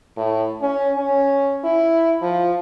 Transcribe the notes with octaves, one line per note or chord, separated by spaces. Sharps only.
A2
C#4
C#4
E4
F3